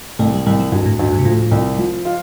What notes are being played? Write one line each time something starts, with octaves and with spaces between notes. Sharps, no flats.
C2 A3
G3
C2 G3
F3
D2 G2
A2
D2 G2
G2
C3
A2 F3
C2
F3
F4